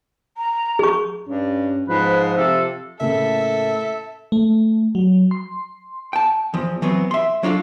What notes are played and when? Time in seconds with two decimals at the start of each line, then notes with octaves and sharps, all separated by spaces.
0.37 A#5
0.79 G#4 C#6
1.28 G2 C#4
1.89 G#2 F3 B4
2.37 C3 A4
3.00 A2 C#3 A#3 A4 E5
4.32 A3
4.95 F#3
5.31 C6
6.13 G5 A5
6.54 E2 F3
6.82 E3 F#3 B3 C4
7.11 E5 C6
7.43 F#3 D4 F4 F#4 A4